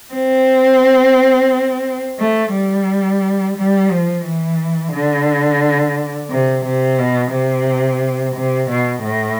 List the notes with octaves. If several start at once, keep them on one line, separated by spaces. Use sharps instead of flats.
C4
A3
G3
G3
F3
E3
D3
C3
C3
B2
C3
C3
B2
A2